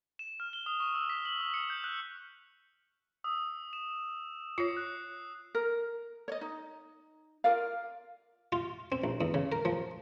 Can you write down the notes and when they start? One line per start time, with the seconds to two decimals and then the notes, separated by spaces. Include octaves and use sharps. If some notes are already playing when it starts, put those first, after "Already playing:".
0.19 E7
0.40 F6
0.53 G7
0.66 D#6
0.80 C#6
0.95 E6
1.09 B6
1.25 F#7
1.41 D#6
1.54 C#7
1.70 G6
1.84 F#6
3.24 D#6 E6
3.73 E7
4.58 F4 C#5 C7
4.77 F#6
5.55 A#4
6.28 C#5 D#5
6.41 D#4
7.44 F4 A#4 D5 F5
8.52 F4
8.92 C4
9.04 A#1
9.21 E2
9.34 C#3
9.52 A#4
9.65 F3